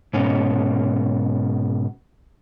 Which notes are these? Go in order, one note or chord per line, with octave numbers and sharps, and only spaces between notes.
G#2 B2 C#4